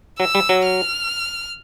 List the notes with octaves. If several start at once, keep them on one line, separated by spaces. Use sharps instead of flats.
F#3 E6
G3
F#3
F6